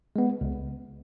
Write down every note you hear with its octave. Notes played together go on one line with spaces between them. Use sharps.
G#3 B3
C#2